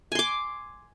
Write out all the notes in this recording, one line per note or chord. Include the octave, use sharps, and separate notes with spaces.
G#5 C6 D6